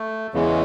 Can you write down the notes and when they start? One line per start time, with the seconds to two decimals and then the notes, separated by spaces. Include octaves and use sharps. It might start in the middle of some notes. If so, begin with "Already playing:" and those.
Already playing: A3
0.34 E2 C#3 E3 G#3